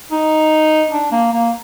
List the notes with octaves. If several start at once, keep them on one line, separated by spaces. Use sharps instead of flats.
D#4
D4
A#3
A#3